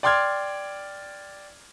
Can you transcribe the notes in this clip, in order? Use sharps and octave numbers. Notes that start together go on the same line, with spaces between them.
D5 G5 C6 D6 F6 G#6